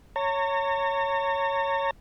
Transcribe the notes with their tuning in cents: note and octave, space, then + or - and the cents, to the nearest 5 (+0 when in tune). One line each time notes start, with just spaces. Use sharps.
C#5 +0 A#5 -40